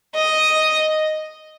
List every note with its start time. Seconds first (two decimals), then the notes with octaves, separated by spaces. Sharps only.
0.15 D#5